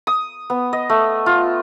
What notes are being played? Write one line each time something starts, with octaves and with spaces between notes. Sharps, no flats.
D#6
B3
D#5
A3
F4